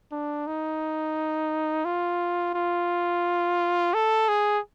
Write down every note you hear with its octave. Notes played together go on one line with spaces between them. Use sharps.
D4
D#4
F4
F4
A4
G#4